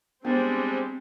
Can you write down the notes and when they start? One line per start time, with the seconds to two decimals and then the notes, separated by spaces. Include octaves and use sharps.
0.25 G3 G#3 B3 C4 D4